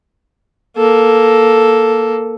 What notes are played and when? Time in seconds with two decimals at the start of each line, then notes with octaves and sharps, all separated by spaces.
0.77 A#3 A4